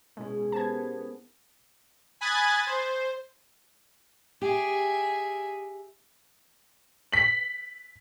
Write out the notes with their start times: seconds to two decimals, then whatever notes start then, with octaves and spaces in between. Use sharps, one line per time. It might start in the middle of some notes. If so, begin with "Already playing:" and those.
0.17 B2 G#3 C#4 E4 G#4
0.52 B3 G4 A#4 C5 A5 G#6
2.21 G#5 B5 D#6 F#6 G#6 A6
2.67 C5
4.42 G4 G#4 E5
7.12 B6 F#7